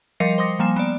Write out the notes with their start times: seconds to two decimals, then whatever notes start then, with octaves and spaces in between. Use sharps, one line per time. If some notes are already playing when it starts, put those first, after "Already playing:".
0.20 F3 G3 A#4 D#5 C7 C#7
0.38 C5 C6 D6 D#6 A#6
0.59 F3 G3 A#3 G#5 E7
0.76 B3 D5